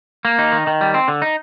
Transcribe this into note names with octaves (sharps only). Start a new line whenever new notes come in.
A#3
D#4
D#3
D#3
G3
C4
D3
D#4